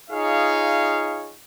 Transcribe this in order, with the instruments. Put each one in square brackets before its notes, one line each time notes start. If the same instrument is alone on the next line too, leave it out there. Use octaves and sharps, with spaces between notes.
[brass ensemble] D#4 F4 G#4 C#5 F5